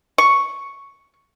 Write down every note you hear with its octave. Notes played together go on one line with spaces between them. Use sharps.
C#6